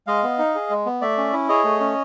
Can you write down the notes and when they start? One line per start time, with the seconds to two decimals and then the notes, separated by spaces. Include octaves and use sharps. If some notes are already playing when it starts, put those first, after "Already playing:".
0.07 G#3 D#5 F5
0.24 B3
0.38 D#4
0.55 G#4
0.70 G#3
0.86 B3
1.01 A3 D5 E5
1.18 C#4
1.33 E4
1.48 G#4 C#5 D#5
1.64 A3
1.80 C#4